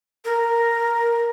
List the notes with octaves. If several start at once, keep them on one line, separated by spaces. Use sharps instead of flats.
A#4